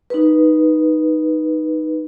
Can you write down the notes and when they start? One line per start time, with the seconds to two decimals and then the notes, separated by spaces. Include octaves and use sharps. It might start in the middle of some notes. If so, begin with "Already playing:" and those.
0.10 D#4 B4